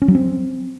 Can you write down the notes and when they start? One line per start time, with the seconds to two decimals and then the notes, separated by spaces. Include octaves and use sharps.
0.02 C#4
0.08 F#3
0.15 C4